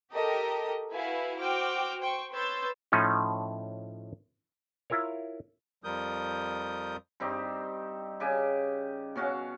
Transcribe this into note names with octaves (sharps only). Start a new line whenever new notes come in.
G4 A4 A#4 D#5
E4 F#4 B4 E5 F5 G#5
F#4 C5 G5 D6 F6
C5 G5 C#6
B4 C#5 C6 E6 G6 A6
A2 F3 A3 C#4 D#4
E4 F4 A#4 C#5
F2 F3 G3 A#4 D#6 G6
G2 C4 D#4 G4
C#3 G4 G#5
B2 C#4 F#4 F5